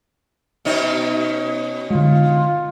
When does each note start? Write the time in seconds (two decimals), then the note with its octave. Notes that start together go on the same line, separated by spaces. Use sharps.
0.65 B2 C#4 D#4
1.90 D3 G#3 F4